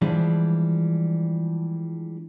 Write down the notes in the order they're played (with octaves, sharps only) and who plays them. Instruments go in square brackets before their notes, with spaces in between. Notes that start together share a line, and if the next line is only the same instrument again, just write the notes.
[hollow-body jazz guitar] E3 F3 G3 G#3 D4